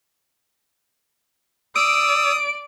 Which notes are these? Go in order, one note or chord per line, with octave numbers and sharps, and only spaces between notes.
D5 D#6 E6 D7